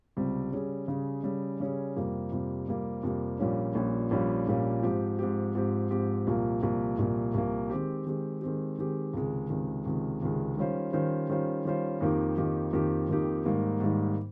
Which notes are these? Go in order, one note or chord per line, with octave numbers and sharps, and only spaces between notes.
C#2 C3 G3 C4
C#3 G3 C#4 G#4
C#3 G3 C#4 G#4
C#3 G3 C#4 G#4
C#3 G3 C#4 G#4
F2 C3 G3 A#3
F2 C3 G3 A#3
F2 C3 G3 A#3
F2 C3 G3 A#3
A#1 A#2 G3 A#3 C#4
A#1 A#2 G3 A#3 C#4
A#1 A#2 G3 A#3 C#4
A#1 A#2 G3 A#3 C#4
G#2 F3 C4 G4
G#2 F3 C4 G4
G#2 F3 C4 G4
G#2 F3 C4 G4
C2 A#2 F3 A#3
C2 A#2 F3 A#3
C2 A#2 F3 A#3
C2 A#2 F3 A#3
D#3 G#3 C4 G4
D#3 G#3 C4 G4
D#3 G#3 C4 G4
D#3 G#3 C4 G4
C#2 C3 D#3 G#3
C#2 C3 D#3 G#3
C#2 C3 D#3 G#3
C#2 C3 D#3 G#3
D#3 G3 C#4 F4 C5
D#3 G3 C#4 F4 C5
D#3 G3 C#4 F4 C5
D#3 G3 C#4 F4 C5
F2 D#3 A#3 D#4 G4
F2 D#3 A#3 D#4 G4
F2 D#3 A#3 D#4 G4
F2 D#3 A#3 D#4 G4
G#2 D#3 G3 A#3 D#4
G#2 D#3 G3 A#3 D#4